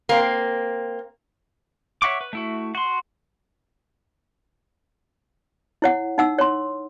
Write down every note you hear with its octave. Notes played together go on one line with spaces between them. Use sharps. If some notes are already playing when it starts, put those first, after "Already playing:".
A#3 C4
C#5 E5 F#5 C#6 D6
B4
A3 E4 F#4
F#4 C6
E4 C#5 F#5
D#4 F#5 E6
C#5 C6